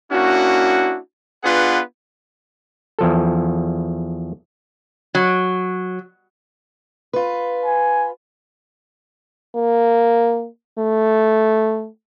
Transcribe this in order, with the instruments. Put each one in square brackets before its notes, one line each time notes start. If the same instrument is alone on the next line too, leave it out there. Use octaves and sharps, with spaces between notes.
[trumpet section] A#3 C#4 D4 E4 F#4
B3 D4 F4 G#4 B4 F#5
[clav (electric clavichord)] E2 F3 A4
[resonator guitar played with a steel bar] F#3
[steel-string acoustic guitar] F4 B4
[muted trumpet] G#5
[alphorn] A#3
A3